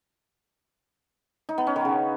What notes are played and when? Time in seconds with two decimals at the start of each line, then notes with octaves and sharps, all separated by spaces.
1.49 D#4
1.58 B3
1.67 C#4
1.76 D#3
1.85 C#3